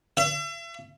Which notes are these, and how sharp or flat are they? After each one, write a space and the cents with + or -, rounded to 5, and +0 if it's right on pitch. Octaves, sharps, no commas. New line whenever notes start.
E5 +40